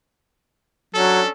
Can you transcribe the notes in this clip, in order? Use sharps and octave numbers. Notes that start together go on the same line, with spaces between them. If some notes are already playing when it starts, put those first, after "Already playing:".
F#3 C#4 D4 A4